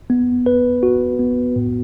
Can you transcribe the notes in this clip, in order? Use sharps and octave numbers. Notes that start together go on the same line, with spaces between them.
B3
B4
F#4
B3
A2